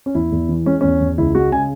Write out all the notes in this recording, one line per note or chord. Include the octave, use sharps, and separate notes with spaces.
C#4
E2 E4
E2
E3
G#3 C#4
E2 C#4
E2
C#2 E4
G#3 F#4
C#3 G#5